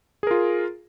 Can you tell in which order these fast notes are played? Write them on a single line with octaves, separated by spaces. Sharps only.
G#4 A#4 F4